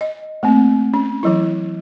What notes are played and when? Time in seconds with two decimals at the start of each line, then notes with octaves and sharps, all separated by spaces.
0.01 D#5
0.43 A3 A#3 C4
0.94 C#4
1.23 E3 F#3 E4